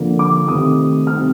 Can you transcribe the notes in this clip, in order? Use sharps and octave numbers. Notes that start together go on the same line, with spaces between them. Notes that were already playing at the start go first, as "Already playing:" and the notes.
Already playing: D3 F3 A#3
D6
C3 D#3 A3 C4 D#6
C3 G3 C4 F6